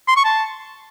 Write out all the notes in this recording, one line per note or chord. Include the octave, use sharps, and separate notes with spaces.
C6
C#6
A5